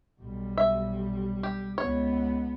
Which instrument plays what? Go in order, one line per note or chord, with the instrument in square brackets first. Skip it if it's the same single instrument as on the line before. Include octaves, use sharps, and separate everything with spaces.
[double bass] B1 G3
[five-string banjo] E5
G4
[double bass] C#2 B3 [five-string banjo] C#5